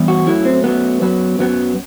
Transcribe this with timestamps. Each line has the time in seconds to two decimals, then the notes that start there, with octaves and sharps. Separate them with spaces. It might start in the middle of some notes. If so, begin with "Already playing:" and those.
Already playing: G2 E3 B3
0.08 F#4
0.27 F#2 F#3 A3 E4
0.45 C4
0.64 F#2 F#3 A3 B3
1.01 F#2 F#3 B3
1.39 F#2 F#3 B3